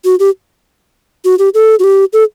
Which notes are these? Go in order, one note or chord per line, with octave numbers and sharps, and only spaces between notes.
F#4
G4
F#4
G4
A4
F#4
G4
A4